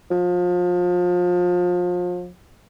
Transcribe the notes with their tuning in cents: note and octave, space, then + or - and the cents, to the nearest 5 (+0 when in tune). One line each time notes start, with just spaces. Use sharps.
F3 +30